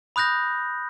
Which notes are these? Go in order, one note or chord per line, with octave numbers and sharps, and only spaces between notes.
B5 D#6 F#6 G6 A#6